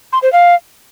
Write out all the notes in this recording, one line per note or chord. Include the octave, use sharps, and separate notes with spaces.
C6
C5
F5